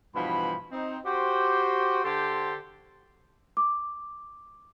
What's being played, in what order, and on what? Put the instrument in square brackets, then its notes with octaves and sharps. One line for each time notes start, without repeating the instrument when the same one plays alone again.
[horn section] G2 B2 E3 F3 B5
C4 D#4
F#4 G4 C5
D3 G4 A4 C5 C6
[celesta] D6